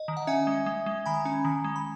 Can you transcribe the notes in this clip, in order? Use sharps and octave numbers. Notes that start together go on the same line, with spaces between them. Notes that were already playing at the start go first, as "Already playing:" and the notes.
Already playing: D#5
D#3
F#5
C#4 E5 G#5
G#3
G#3
G#3
D#3 G#5 B5
C#4
D#3
G#3
B5